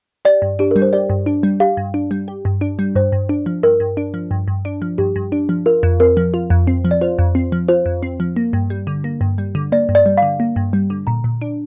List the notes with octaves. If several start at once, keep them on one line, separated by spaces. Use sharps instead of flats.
G4 D5
G2
D4 G4
G3 A#4
C5
G4 D5
G2
D4
G3
G4 F5
G2
D4
G3
G4
G2
D4
G3
G2 C5
G2
D4
F3
G2 A#4
G2
D4
F3
G2
G2
D4
F3
G2 G4
G2
D4
F3
F4 A#4
F2
C4 A#4
F3
F4
F2
C4
F3
D5
F4 C5
F2
C4
F3
F4 C5
F2
C4
F3
A#3
G2
G3
D3
A#3
G2
G3
D3
A#3 D5
G2
D5
G3
D3 F5
A#3
G2
G3
D3
A#2 A#5
A#2
D4